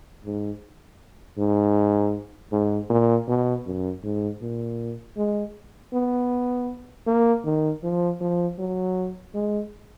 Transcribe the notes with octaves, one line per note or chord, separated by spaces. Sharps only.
G#2
G#2
G#2
A#2
B2
F#2
G#2
A#2
G#3
B3
A#3
D#3
F3
F3
F#3
G#3